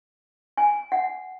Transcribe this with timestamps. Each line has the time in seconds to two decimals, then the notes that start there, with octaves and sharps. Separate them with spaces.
0.57 G#5
0.92 F#5